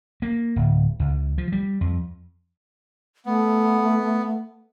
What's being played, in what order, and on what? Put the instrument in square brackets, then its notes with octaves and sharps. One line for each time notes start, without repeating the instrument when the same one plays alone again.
[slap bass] A#3
D1
C#2
F3
G3
F2
[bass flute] A3 [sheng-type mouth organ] B3